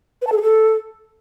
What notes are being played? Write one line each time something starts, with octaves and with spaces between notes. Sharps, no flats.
B4
A5
A4
G#4
A4